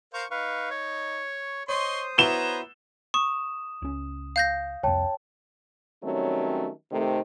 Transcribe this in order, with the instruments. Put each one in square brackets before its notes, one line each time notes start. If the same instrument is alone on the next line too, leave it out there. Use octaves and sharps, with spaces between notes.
[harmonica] A#4 C5 F5 [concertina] C#6
[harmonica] D#4 [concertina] B4 F5 C#6
[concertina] C#5 C#6
[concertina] C5 D#6 [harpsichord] C#5 [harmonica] D#5 C6 C#6
[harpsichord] B3 E4 F#4 [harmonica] B4 C#5 A#5 [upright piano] E7 G7
[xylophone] C#6 [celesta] D#6 E7
[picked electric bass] C#2 C#4
[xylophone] F5 G6 A#6
[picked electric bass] C2 F2 [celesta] C#5 G5 A5
[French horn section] D#3 F#3 G3 A3 C4 C#4
C3 D#3 A3